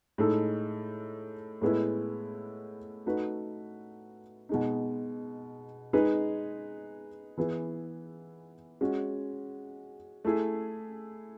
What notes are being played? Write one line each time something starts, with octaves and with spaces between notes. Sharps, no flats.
A2 G#3 D#4 A4
A2 G#3 B3 E4
A3 D#4 F#4 B4
B2 G#3 D#4
G#3 D#4 G#4 B4
E3 B3 E4 G#4
G#3 C#4 F#4
A3 E4 G#4